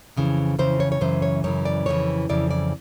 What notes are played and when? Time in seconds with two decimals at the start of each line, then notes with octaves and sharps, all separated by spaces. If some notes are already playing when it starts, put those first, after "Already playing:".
0.17 F2 C#3 E3
0.59 F2 C#3 E3 C5
0.80 C#5
0.92 C#5
1.01 F#2 C#3 E3 C5
1.22 C#5
1.44 F#2 C#3 E3 C#5
1.65 D5
1.86 F2 C#3 E3 C#5
2.29 F2 C#3 E3 D5
2.51 D5